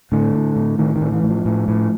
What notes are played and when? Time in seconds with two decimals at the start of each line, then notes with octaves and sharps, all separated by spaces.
0.12 A2 D3
0.34 A2
0.56 A2
0.78 A2 D#3
0.96 D#3
1.01 A2
1.12 E3
1.23 A2
1.29 F3
1.45 A2
1.68 A2